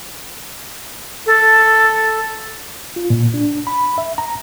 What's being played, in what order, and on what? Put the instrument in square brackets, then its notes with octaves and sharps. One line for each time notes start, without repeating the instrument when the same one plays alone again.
[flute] A4
[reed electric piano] F4
A#2
D4
B5
E5
A#5